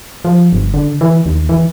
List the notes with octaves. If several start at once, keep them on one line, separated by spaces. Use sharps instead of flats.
F3
G1
D3
E3
D#2
E3